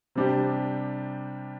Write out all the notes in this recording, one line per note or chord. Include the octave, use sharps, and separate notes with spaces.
C3 G3 D4 G4